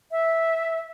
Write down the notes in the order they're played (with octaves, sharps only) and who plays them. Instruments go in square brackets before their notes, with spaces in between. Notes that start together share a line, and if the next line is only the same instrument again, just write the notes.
[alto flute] E5